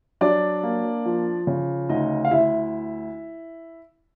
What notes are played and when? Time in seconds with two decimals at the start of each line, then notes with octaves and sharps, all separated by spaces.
0.21 F#3 D4 D5
0.63 A#3
1.05 F3
1.47 C#3
1.89 D2 D#4 D#5
2.25 F5
2.31 D2 E4 E5